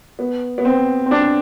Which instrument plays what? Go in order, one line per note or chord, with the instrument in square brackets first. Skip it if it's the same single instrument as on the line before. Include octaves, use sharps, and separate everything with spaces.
[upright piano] B3
B3
C4
C4
D4